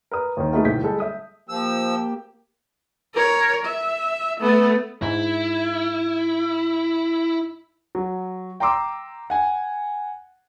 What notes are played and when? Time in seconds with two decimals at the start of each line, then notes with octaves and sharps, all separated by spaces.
0.11 A#4 B4 D#6
0.37 D#2 D#3
0.53 G#3 A3 B3 D#4 F#4 A#4
0.65 D1 B1 G6 B6
0.83 G3 G#3 A4
1.00 E5 D#6
1.49 F3 A#3 G4 E6
3.14 A#4 C#5
3.65 E5
4.40 A3 B3
5.02 G#2 E4
7.95 F#3
8.60 G5 A#5 C6 D6 E6
9.30 F#5 G#5